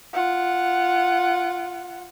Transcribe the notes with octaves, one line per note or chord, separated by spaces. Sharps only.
F4 F#5